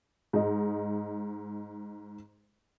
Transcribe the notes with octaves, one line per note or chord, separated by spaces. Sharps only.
G#2 D#5